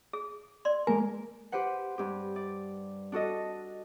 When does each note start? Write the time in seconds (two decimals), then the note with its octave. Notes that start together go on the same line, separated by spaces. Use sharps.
0.13 G#4
0.65 D5 C6
0.87 G#3 A#3 A#4 G#5
1.52 G4 B4 C5 F#5
1.98 G2 G4
2.36 D5
3.12 D4 F#4 A4 D#5